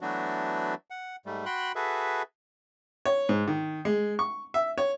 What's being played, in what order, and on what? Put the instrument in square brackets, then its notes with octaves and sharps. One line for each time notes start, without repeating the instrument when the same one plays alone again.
[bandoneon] E3 F#3 A3 B3 D4 F#4
F#5
G#2 G3 A3
F#4 G5 B5 C6 F#6
F#4 G#4 A4 B4 E5
[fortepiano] C#5
G#2
D#3
G#3
C#6
E5
C#5